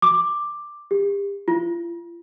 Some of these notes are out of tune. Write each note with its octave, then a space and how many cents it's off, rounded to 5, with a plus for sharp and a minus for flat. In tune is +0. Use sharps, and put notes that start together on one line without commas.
D6 +10
G4 +35
F4 -40